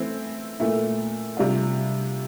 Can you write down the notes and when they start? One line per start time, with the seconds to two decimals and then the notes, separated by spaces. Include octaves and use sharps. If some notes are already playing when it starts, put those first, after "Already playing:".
Already playing: E3 A3 C4 E4
0.60 A#2 A3 E4
1.37 C3 G3 D4 F4